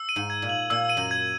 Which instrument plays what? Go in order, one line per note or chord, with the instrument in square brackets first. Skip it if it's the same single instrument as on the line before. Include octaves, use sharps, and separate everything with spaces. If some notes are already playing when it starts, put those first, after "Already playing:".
Already playing: [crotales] E6
D#7
[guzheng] G#2
[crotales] G#6
[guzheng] A#2
[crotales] F#7
[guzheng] A#2 [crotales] E6
[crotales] D#7
[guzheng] F#2
[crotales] G#6